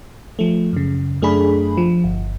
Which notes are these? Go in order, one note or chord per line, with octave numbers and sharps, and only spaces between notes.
F3 A3
F#2 C#3
F#2 A3 D4 G#4 B5
F3
G1